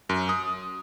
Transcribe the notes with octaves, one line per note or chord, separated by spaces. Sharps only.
F#2
D#6